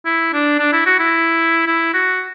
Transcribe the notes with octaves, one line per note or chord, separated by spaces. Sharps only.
E4
D4
D4
E4
F#4
E4
E4
F#4